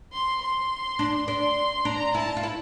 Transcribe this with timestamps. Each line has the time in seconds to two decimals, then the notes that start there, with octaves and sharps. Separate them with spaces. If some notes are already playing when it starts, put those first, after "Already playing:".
0.13 C6
0.41 C6
0.99 D4
1.28 D4 C6
1.85 D4 A#5
2.15 E4 A5
2.37 F4
2.43 E4